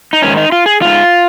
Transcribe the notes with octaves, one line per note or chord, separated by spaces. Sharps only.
D#4
G#2 D#3 C#4
D#4
F4
G#4
G#2 D#3 F4